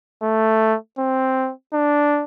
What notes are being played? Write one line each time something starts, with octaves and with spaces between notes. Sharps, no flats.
A3
C4
D4